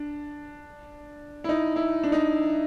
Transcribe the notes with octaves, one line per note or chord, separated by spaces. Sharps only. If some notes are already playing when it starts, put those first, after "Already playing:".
Already playing: D4
E4
D#4
E4
D4
D#4